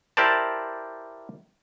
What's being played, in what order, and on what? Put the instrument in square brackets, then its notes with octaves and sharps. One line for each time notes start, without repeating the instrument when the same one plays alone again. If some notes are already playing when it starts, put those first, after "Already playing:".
[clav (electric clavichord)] E4 G4 A#4 C5 D5 A5